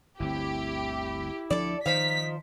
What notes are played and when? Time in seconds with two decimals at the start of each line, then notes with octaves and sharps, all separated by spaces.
0.20 G1 D2 C4 E4 G4
1.50 D2 F3 D4 A4 D5
1.86 D#3 F3 D#4 C5 F5 B6